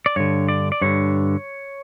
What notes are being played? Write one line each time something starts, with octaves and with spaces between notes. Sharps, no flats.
D5
G2 D3 C#5
D5
D5
G2 D3 C#5